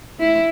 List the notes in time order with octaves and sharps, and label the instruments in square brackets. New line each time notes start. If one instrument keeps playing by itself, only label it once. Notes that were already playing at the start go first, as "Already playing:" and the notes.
[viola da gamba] E4